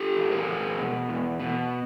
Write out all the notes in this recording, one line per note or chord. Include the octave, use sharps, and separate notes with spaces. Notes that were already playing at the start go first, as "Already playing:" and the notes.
Already playing: G4 A4
E2
G#4 A#4
E2
B2
E2
B2